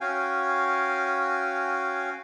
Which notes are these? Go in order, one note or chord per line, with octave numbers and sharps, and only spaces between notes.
C#4 F#4 F5 G5 G#5